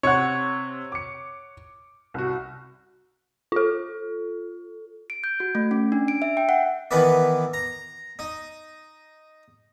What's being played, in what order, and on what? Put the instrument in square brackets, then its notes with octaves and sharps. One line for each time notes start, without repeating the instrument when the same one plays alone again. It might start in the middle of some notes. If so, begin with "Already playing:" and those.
[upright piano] C3 [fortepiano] C#5 F#5
[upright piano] D6 C#7
C2 F#4
[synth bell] F4 A4
[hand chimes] D7
G6
F#4
A3
C#4
D4
D7
E5
G5
F#5
[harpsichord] D#3 E3 B3 B4 D5
A#5
D#4